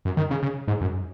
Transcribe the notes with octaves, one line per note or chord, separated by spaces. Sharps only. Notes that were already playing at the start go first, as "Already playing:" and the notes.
F#2
D#3
C#3
C#3
G#2
F#2